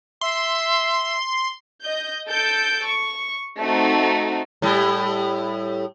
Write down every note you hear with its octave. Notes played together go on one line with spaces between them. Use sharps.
E5 C6
D#5 G6
A4 G6 D7
C#6
A3 C4 D#4 F#4
A2 G3 E4